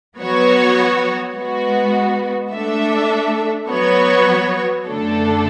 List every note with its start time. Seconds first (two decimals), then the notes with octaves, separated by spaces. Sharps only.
0.19 F#3 B3 F#4 C#5
1.36 G#3 B3 F#4
2.53 A3 D4 A4 E5
3.69 F#3 B3 F#4 C#5
4.86 F#2 D3 A3 D4 A4